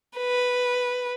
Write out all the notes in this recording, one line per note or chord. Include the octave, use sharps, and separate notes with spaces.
B4